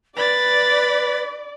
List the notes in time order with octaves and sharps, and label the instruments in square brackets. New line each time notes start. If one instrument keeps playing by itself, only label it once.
[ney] B4 [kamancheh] D5 [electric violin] B5 A6